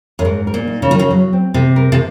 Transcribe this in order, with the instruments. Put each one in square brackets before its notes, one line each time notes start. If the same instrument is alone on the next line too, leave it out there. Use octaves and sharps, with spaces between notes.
[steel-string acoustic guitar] F#2
[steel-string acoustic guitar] G#2 [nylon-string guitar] A#4
[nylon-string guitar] A#4
[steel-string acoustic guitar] A#2
[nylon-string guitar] D#4
[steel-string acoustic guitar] C#3
[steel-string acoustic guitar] D#3 [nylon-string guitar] F#3
[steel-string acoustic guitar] C#3
[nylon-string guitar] F#3
C4
[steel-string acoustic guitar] C3 [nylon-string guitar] C4
[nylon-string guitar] A#4
[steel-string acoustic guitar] C3